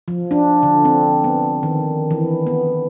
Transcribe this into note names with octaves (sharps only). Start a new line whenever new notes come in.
F3
D4
D3
C4
B3
D#3
E3
B3